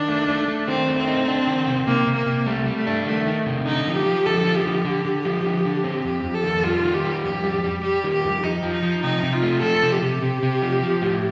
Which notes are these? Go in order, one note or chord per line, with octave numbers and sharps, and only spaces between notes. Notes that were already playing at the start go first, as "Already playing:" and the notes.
Already playing: D#3 D4
A3
A3
A3
D#3 C4
A3
C4
D#4
D4
D#3
C3
C3 A#3
C3
A#3
C3
G3 A3
G3
A3
D4
D#3 A3
D#3
C3
D3 D#4
F3
G4
F3
D3 A4
F3
G4
D3
D3
D3
F3
D3
D3
C4
F2 G4
F2
A4
D#3
G3 F4
D#3
G4
G3
F2 G4
G3
G3
G3 G4
D#3
G4
F2
F3 D#4
F3
D#4
F3
C3 D#4
C3
F4
A3
F3 A4
C3
G4
C3
C3
C3
F3
F3
A2